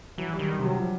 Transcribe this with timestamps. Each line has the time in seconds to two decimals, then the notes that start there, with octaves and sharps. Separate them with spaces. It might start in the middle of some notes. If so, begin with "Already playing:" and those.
0.18 E3 F#3
0.33 G3
0.39 D#3
0.49 G3
0.59 C3
0.64 F#3
0.80 F3